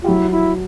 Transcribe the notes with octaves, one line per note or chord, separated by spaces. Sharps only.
F4 G4
F#3 E4 F#4
E4